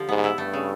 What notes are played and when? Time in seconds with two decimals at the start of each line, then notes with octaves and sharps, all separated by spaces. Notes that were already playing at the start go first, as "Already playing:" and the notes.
Already playing: D3 F3 G3
0.09 G#2 B3
0.24 E4
0.38 G2 A3
0.53 C#3